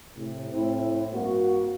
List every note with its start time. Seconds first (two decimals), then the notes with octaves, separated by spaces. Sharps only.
0.17 A2 C3
0.52 A2 C4 E4
1.13 G2 A#3 F#4